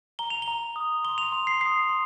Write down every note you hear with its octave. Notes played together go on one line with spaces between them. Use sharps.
A#5 G7
F7
G7
A#5
D#6
C6 G7
F7
C6
C7
D#6 C7
C6